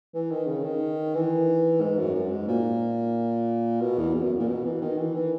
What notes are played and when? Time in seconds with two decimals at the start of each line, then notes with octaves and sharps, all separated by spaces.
0.15 E3
0.31 D#3
0.47 C#3
0.64 D#3
1.15 E3
1.81 G#2
1.98 F#2
2.15 F#2
2.31 G#2
2.48 A#2
3.81 B2
3.98 E2
4.14 E2
4.23 F#2
4.39 A#2
4.48 B2
4.65 E3
4.81 D#3
4.98 E3
5.15 E3